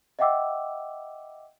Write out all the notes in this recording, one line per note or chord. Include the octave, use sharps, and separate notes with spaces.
D#5 E5 F#5 G5 D6 E6